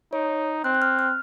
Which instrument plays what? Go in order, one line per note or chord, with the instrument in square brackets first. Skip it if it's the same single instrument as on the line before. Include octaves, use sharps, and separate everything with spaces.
[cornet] D#4 [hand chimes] C#5
[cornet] C4 [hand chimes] F#6
[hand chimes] F#6
F6
F6